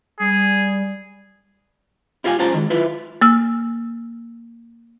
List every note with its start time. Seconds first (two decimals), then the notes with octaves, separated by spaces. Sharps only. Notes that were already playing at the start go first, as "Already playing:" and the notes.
0.20 G3 G#4
2.24 E4 F4 G4 F5 G#5
2.39 C#2 C#3 F4 C5 A5 A#5
2.54 D#3 G#3
2.70 E4 F4 B4 E5
3.21 A#3 E6 F6